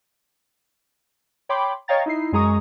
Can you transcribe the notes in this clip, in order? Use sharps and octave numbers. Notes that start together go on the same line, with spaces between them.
C#5 G5 B5 C6 D6
C#5 D#5 F5 G5 A#5 A6
D#4 E4 C7
F#2 G#3 G#4 A#5 C#6 D#6